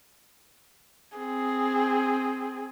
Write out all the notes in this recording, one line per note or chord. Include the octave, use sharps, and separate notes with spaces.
C4 G#4